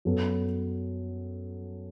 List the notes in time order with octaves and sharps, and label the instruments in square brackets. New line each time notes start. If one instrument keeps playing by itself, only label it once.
[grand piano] F#2 F#3 B3 F#4 A4